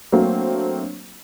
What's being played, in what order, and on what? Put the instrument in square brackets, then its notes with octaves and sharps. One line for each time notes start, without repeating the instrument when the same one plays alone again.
[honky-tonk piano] F#3 A3 A#3 C4 D4